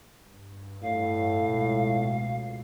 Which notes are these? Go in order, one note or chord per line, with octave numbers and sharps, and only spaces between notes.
G2
A2 F5
C#2 B2